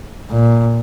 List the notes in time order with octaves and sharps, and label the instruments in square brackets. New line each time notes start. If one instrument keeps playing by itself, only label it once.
[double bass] A#2